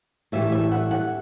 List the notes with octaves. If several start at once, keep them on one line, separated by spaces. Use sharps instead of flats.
A2 E3 G3 E5
E5
F#5
F#5